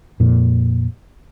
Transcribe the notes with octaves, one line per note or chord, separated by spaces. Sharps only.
F2 A#2